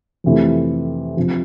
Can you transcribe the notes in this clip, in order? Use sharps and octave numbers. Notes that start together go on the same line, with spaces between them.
F2 C3 E3 A3
C3 F3